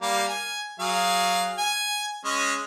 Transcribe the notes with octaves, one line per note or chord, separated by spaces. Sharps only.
G3 A#3 F5
G#5
F#3 G#4 F5
G#5
G#3 C#4